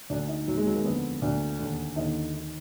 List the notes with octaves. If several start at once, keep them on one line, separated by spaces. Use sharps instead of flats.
D2 D3 D4
D#4
D#2 D#3 F#3
G#3
F#3
A#3
F2 D3 B3
D2 D3 D4
D#2 D3
D#2 D3 D#4
D#3